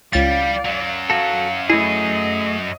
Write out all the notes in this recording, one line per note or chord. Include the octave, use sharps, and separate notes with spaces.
C#2 G3 D5 F5 A6
F#2 F#3
F#4 A4 F5
A3 E4 G#4 D#5